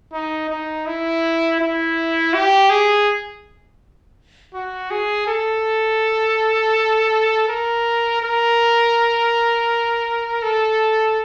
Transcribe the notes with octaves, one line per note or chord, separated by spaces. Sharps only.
D#4
D#4
E4
E4
G4
G#4
F#4
G#4
A4
A#4
A#4
A4